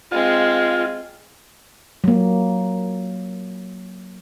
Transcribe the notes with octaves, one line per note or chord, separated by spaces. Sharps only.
G#3 C4 F4
F#3 A#3